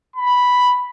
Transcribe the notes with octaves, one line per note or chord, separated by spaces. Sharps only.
B5